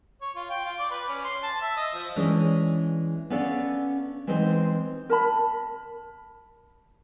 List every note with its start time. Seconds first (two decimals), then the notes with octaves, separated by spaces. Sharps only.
0.21 C#5
0.36 F4
0.51 G5
0.65 F4
0.79 D5
0.91 B4
1.09 C#4
1.25 C6
1.43 A5
1.62 E5
1.77 D#5
1.94 F3
2.16 E3 G#3 C#4 D4
3.30 B3 C#4 D4 A4 D5 F5
4.27 E3 G#3 B3 C4 D#4 C5
5.10 A#4 A5 B5